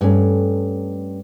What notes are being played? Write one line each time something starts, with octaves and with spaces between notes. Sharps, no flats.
G2 A3 C#4 A4